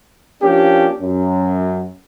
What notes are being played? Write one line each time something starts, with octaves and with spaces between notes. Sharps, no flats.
F3 A#3 C#4 D4 G4
F#2